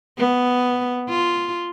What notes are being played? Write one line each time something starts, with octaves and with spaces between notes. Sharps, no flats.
B3
F4